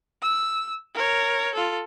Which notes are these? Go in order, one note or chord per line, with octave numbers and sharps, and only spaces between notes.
E6
A#4 C#5
F4 A4